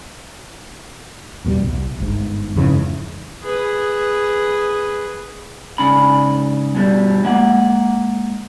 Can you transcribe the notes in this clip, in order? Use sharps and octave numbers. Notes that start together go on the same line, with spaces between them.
A1 E2 B2 G3
C2
G1 G#2
F2 G#2 C#3 E3
G#4 B4
G#2 C#3 D4 B5
G2 B2 D3 G3
G#3 A#3 F#5